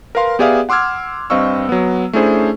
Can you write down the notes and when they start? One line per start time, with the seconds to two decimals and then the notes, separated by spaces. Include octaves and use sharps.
0.15 A#4 B4 F5 C6
0.39 B3 G4 G#4 D5 E5 F5
0.69 F#5 C6 D6 E6 F6 G#6
1.30 G2 C4 D#5 F5 C#6 E6
1.69 F#3 B3
2.13 A3 C#4 D4 E4 G#4 C5